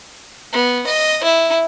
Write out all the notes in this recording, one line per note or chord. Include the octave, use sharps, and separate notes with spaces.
B3
D#5
E4